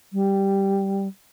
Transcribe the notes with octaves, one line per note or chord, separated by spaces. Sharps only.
G3